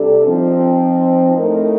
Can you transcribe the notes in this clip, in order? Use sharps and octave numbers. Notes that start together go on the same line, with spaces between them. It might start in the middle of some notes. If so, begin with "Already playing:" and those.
Already playing: C3 G3 D4 A4
F3 C4 D#4
A2 A3 D#4 A#4